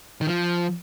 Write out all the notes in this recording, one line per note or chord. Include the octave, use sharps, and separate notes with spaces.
D#3
F3